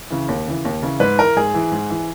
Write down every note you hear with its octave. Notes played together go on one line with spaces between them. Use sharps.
C#3 E3
D#2
C#3 E3
D#2
C#3 E3
G#2 B4
E3 A#4
G#2 G#4
E3
G#2
E3